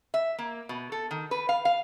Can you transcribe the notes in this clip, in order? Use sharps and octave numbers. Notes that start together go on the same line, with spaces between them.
E5
A#3
B2
A4
D#3
B4
F5
F5